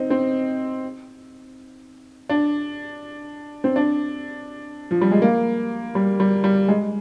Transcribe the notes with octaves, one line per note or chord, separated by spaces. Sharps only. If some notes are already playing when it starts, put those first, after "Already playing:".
Already playing: C4 D#4
C4
D4
C4
D4
F3
G3
G#3
A#3
G3
G3
G3
G#3